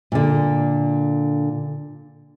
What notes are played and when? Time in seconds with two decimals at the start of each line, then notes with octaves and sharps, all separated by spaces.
0.12 A#2 D3